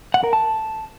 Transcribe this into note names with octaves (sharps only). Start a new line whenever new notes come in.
F#5
A#4
A5